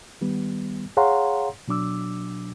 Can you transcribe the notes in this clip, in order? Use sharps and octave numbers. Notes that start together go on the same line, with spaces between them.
D#3 G3 B3
G#4 C#5 F5 F#5 A#5 C6
B2 F#3 D4 D6 E6